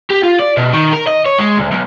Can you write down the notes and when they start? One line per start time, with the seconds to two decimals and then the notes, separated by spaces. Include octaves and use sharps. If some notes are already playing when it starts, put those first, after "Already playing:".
0.10 G4
0.23 F4
0.39 D5
0.57 B2
0.74 D#3
0.93 A#4
1.07 D#5
1.26 C#5
1.39 G#3
1.57 D2
1.71 B1